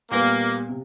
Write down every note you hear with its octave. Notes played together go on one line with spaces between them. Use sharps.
A#2 G3 A#3 B3
C3